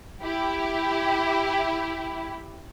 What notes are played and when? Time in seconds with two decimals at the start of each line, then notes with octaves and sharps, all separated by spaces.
0.22 E4 G4